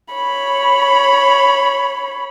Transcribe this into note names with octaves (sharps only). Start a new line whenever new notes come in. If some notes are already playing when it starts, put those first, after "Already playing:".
C#5 B5